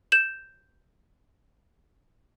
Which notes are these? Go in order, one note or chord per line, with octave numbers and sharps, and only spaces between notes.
G6 E7 F#7